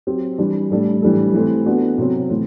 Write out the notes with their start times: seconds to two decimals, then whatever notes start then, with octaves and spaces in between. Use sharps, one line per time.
0.07 F#3 C4 G4
0.38 E3 G3 D4
0.70 A2 G3 D4 A4
1.02 A2 E3 G3 D4 A4
1.34 E3 A3 C4
1.66 B3 D4 F#4
1.98 C3 F#3 C4
2.30 A2 E3